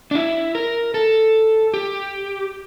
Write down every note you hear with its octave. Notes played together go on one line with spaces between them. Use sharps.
D4
E4
A#4
A4
G4